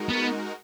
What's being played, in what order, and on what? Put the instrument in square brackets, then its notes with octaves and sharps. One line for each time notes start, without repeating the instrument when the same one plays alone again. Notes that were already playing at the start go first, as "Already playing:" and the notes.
Already playing: [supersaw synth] G#3 D#4 F#4 A#4
[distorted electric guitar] B3